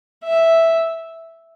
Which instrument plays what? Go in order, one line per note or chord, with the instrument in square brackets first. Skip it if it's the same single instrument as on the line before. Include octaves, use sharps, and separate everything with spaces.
[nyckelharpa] E5